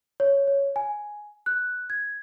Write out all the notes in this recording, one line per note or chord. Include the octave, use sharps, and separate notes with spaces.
C#5
C#5
G#5
F#6
G#6